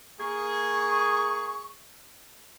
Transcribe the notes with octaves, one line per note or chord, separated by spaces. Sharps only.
A#3 G#4 C#6